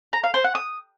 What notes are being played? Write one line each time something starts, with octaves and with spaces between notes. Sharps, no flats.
A#5
F5
C5
F#5
D#6